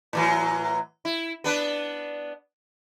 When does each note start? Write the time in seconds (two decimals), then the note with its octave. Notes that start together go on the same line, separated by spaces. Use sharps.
0.13 A2 E3 F#3
1.05 E4
1.44 B3 D4 B4